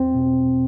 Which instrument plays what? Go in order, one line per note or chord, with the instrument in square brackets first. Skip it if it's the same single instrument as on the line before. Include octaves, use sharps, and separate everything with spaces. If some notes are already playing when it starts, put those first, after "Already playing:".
Already playing: [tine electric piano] E2 C4
B2